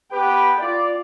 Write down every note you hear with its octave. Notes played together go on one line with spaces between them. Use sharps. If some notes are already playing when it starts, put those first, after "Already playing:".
B3 G4 B4 G5
F4 D5